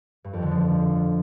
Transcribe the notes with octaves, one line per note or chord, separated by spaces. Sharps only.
G2
F2
D3
F3